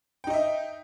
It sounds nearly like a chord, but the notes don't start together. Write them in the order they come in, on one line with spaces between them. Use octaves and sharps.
G5 D#4 D#5 E5